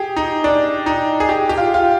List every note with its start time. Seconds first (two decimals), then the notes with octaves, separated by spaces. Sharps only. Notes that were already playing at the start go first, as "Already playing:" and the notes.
Already playing: G4 G#4
0.16 D#4
0.44 D4
0.86 D#4
1.20 G#4
1.29 G4
1.49 G4
1.58 F4
1.74 F4